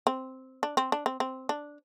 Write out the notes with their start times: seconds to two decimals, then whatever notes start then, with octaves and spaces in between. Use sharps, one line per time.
0.07 C4
0.63 D4
0.77 C4
0.92 D4
1.06 C4
1.20 C4
1.49 D4